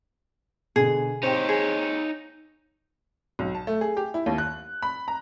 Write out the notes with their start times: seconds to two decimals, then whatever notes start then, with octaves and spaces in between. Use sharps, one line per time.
0.76 B2 D3 G#4
1.23 C4 D#4 G4 C#5
1.49 G#4
3.39 B1
3.55 A5
3.67 A3
3.81 G#4
3.97 G4
4.14 E4
4.26 D#2
4.38 F#6
4.82 B5
5.08 A#5